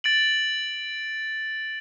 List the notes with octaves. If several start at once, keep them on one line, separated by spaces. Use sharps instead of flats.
A6 D7 F#7